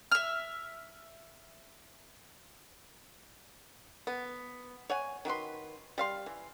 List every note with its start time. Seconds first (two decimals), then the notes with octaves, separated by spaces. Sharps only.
0.12 E5 F6
4.07 B3
4.90 C#5 F#5 G#5
5.25 D#3 F#4 B4 C6
5.98 G3 F5 C6
6.26 E3